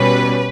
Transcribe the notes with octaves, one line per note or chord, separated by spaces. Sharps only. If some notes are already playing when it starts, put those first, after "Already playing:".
Already playing: B2 G3 C#4 B4